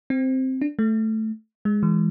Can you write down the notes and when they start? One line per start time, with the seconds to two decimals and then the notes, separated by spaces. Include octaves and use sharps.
0.10 C4
0.61 D4
0.79 A3
1.65 G#3
1.83 E3